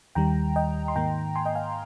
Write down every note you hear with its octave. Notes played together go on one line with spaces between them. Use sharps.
D#2 D#3 G3 G5 A#5
D#5 G5
C6
G#2 D#3 A#3 G5 A#5
G#5 C6
D#5 G5
F5 G#5